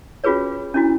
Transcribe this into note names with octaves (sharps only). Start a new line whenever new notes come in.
C#4 F4 F#4 G#4 B4 C#5
C#4 D4 E4 F#4